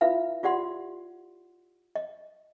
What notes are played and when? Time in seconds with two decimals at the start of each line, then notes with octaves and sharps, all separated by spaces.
0.01 E4 F4 B4 E5 F5
0.43 F4 G4 D5 F#5 C6
1.95 D#5